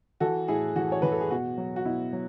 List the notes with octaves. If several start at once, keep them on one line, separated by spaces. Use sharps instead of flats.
E3 F#4 A4
A2 E4 G#4
E3 F#4
C#5
E3 B4
A4
G#4
B2 F#4
F#3
F#4
B2 E4
F#3